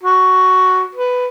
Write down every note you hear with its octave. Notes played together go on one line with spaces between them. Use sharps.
F#4
B4